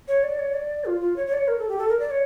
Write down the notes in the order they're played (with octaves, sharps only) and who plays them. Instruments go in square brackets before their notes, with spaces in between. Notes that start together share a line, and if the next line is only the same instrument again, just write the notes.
[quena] C#5
D5
C#5
D5
F4
F4
C#5
C#5
D5
C#5
A#4
A4
G4
A4
A#4
D5
C#5